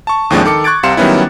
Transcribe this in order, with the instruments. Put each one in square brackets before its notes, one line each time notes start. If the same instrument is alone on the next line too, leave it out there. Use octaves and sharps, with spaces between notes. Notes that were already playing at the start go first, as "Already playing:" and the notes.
[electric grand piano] A5 C#6
D#2 A2 F3 G#3 C4 D4
D#3 A4 D6 C#7
C#6 F#6 G#6 A6 D7
C2 C3 F5 C6 C#7 E7
D#3 F#3 G3 B3 C#4 E4